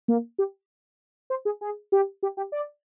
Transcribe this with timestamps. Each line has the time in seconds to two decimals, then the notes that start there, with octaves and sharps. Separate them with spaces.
0.08 A#3
0.38 G4
1.30 C5
1.45 G#4
1.61 G#4
1.92 G4
2.23 G4
2.37 G4
2.52 D5